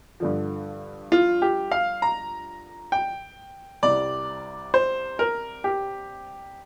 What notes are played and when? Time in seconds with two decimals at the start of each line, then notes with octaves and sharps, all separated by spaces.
0.20 G2 D3 F3
1.12 F4
1.42 G4
1.72 F5
2.02 A#5
2.92 G5
3.83 C2 C3 G3 D5
4.74 C5
5.19 A#4
5.64 G4